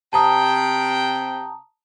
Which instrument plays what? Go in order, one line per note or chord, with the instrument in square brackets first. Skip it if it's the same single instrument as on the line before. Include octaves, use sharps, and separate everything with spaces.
[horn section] C3 G5 [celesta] A5 A#5 D#6